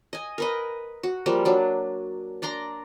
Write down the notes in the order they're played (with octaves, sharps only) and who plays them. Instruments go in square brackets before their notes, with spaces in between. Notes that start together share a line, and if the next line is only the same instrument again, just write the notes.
[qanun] D#5 G#5
A#4 B4 D#5
F#4
F3 G3 A#3
F#3 D4
D4 D5 A#5 C6